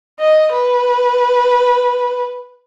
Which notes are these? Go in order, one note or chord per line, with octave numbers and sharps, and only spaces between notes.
D#5
B4